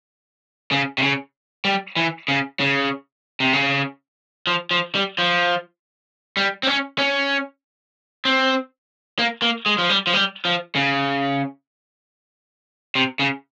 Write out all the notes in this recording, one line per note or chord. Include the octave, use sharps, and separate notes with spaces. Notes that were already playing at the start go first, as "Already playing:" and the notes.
C#3
C3
C#3
G3
E3
C#3
C#3
C3
C#3
F3
F3
G3
F3
G3
C4
C#4
C#4
C4
A#3
A#3
G#3
F3
G3
F3
G3
F3
C#3
C3
C#3